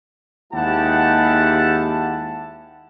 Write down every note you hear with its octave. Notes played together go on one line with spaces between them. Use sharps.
D#2 G#3 E4 G4 F#5 A5